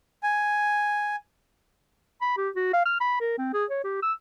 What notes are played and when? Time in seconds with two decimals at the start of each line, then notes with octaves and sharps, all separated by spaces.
0.23 G#5
2.22 B5
2.37 G4
2.56 F#4
2.73 F5
2.86 F6
3.01 B5
3.20 A#4
3.38 C4
3.54 G#4
3.70 C#5
3.84 G4
4.03 E6